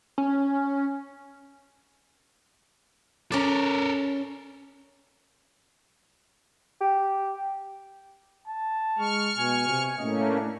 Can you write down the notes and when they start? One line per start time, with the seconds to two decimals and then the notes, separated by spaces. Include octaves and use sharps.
0.18 C#4
3.32 C#4 A4 A#4 D5
6.81 G4
8.47 A5
8.99 G#3 C#6 F6
9.38 B2 G#5
9.68 C3
9.98 A2 A3 A#3 C#4 D#5
10.28 D4